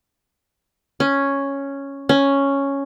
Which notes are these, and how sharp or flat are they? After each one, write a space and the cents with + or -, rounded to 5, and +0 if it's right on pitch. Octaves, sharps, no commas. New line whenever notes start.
C#4 +0
C#4 +0